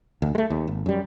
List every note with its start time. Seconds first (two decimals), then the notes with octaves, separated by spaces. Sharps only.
0.22 D2
0.35 G#3 A3
0.50 D#2
0.67 G#1
0.86 F#2 G3